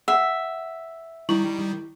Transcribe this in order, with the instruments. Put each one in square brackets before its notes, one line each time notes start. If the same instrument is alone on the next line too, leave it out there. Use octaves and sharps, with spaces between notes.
[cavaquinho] E5 [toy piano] F#5
[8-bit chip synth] D#3 G3 [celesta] E4 C#6 F#7